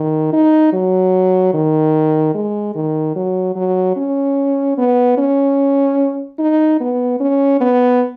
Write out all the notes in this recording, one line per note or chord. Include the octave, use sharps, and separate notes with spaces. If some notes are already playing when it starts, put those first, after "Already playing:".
Already playing: D#3
D#4
F#3
D#3
G#3
D#3
F#3
F#3
C#4
B3
C#4
D#4
B3
C#4
B3